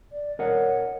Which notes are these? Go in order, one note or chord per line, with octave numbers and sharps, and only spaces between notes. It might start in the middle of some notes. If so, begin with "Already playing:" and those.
D5
A#4 C#5 D#5 F#5